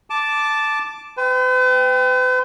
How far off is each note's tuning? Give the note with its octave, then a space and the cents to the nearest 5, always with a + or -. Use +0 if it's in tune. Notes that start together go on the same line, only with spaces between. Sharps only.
A5 -5 D6 +0
B4 +45 G5 +0